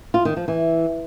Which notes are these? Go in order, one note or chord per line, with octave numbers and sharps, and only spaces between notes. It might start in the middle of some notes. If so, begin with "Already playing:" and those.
F4
D#3
F3
E3